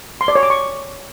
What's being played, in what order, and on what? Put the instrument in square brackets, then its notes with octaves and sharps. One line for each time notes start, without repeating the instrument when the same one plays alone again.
[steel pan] C6
D5
C#5
D6
C#6